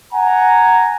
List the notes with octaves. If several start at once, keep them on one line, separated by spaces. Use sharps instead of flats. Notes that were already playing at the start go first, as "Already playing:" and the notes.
F#5 G#5 A#5